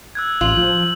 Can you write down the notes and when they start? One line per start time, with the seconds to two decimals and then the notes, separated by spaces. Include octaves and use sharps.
0.15 E6 F#6 G#6
0.41 A1 F4 F#7
0.57 F3 G6